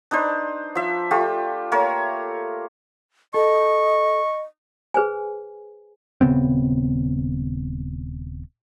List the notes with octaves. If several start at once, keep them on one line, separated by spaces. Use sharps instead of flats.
D4 D#4 B4 C5
F3 E5
A3 F4 G4
A3 A#3 A#4 C#5
A4 D#5 C#6
G#4 B4 C5 G#5
D#1 C#3 B3 C4